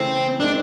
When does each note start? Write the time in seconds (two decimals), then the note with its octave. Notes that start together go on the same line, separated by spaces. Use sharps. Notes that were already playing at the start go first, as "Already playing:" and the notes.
Already playing: C#3 E3 A3 C4
0.40 D#3 G#3 C4 D4